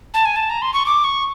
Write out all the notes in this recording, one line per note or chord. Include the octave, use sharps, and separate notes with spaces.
A5
G#5
A5
A#5
C6
C#6
D6
C#6